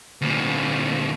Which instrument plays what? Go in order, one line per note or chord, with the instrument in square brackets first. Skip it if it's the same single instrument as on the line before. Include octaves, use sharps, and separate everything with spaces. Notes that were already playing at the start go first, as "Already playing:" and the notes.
[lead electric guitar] D2 A#2